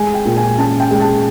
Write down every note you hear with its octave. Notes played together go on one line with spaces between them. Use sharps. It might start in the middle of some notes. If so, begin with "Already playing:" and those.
Already playing: G#3 G#5
G5
A#2
G#5
C#4 A5
G5
G#3
A5